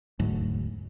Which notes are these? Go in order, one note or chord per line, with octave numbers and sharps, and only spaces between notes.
E1 D2 G#2 F#3